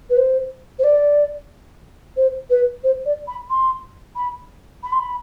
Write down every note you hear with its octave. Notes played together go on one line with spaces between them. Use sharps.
B4
C5
C5
D5
C5
B4
C5
D5
B5
C6
B5
B5
C6
B5